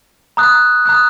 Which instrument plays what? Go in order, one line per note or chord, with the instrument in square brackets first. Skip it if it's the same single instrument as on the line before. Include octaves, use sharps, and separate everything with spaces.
[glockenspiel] A#5 D#6 F#6
A#5 D#6 F#6